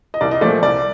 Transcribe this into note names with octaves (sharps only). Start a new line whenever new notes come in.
D#5
C2 D5
D#5
A#2 F3 A3 D5
C2 D5